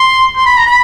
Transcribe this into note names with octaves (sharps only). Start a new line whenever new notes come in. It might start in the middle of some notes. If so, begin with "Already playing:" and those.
Already playing: C6
C6
B5
A#5
B5